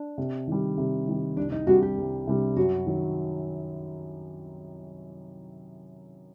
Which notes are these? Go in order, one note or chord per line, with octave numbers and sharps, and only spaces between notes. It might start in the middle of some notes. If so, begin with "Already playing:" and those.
Already playing: D4
C3
D#3 G3
C3
D#3 G3
C2 D4
D#4
C3 G3 D4 F#4
G4
C2
C3 G3 D4
F#2 F#4
D#3 F#3